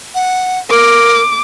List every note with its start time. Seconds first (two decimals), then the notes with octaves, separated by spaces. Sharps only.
0.15 F#5
0.70 A#4 D6